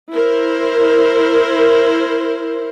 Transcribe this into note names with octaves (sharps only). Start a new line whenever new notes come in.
E4 A#4 C5